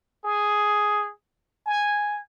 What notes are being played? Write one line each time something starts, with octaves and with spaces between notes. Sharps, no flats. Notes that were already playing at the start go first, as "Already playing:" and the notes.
G#4
G#5